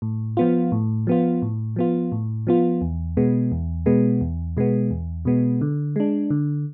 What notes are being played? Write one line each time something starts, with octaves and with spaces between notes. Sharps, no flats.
A2
F3 B3 F4
A2
F3 B3 F4
A2
F3 B3 F4
A2
F3 B3 F4
E2
B2 G#3 B3
E2
B2 G#3 B3
E2
B2 G#3 B3
E2
B2 G#3 B3
D3
G#3 D4
D3